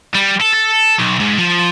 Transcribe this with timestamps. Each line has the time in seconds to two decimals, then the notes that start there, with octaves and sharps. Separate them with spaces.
0.15 G3
0.41 A4
0.54 A4
0.99 B1
1.20 G#2
1.38 F3